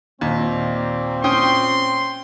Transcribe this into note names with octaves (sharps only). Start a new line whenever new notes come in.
D#2 A#2 A#3 C4
C#4 G5 C6 D#6